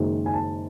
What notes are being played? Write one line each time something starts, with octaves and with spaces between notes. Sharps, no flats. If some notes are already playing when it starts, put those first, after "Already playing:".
Already playing: F#1 F#2 D#3 G#3
G#5
A5